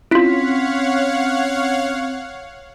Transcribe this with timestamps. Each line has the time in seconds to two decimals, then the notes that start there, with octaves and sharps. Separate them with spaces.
0.11 C4 C#4 E4 F4 C#5 F5 F#5 B6